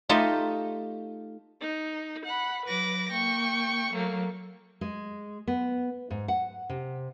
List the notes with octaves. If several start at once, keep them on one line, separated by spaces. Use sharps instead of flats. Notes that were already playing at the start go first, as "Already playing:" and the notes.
A3 D#4 F4 G4 D#5
D#4
F#5 B5
F#3 B4 D6 A#6
A#3 G5 C#6
F#3 A3 A#3
G#3
B3
G#2
F#5
C3